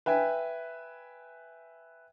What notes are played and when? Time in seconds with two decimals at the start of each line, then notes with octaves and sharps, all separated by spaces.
0.06 B4 E5 G5 G#5